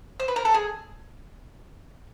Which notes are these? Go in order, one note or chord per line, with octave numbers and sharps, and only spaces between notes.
C5
B4
A#4
A4
G#4